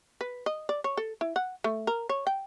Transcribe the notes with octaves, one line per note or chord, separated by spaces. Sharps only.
B4
D#5
D5
C#5
A4
E4
F#5
A3
A#4
C#5
G5